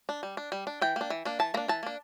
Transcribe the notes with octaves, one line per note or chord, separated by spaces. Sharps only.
D4
G3
D4
G3
D4
E3 G5
A#3 D4
E3
A#3 D4
E3 A5
A#3 D4 A#5
E3 A5
A#3 D4